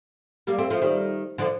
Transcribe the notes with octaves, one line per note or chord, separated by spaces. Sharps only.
G3 A#3
A3 C4
F3 A3
D#3 G3
D3 F3